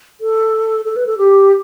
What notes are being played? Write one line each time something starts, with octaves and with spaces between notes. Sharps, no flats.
A4
A4
B4
A4
G4